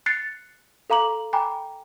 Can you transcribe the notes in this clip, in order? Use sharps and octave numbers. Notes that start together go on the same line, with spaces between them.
F#6 A6 C7 C#7
A4 F5 A#5 D6 F#7
G5 G#5 A#5 B5 D6